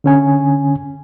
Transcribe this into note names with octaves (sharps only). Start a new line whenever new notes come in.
D3 C#4 G#5